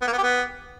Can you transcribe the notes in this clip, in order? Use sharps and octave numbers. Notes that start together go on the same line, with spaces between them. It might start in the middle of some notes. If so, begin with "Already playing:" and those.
B3
A#3
B3
G4
B3